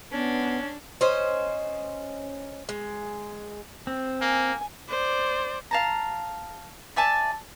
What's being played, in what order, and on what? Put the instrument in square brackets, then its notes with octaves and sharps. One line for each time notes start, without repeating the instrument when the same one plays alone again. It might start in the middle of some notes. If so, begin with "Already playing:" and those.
[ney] B3 [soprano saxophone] C#4 [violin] D4
[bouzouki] C#4 C5 D#5
G#3
[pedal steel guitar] C4
[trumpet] A#3 [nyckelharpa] G#5
[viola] C5 D5
[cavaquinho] F5 A5 A#5
D5 E5 G#5 A5